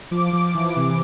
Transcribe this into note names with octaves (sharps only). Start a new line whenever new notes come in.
F3 D6
F3
E3
C3